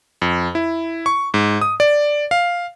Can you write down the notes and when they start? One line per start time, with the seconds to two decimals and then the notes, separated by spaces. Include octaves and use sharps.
0.22 F2
0.55 E4
1.06 C#6
1.34 G#2
1.61 D#6
1.80 D5
2.31 F5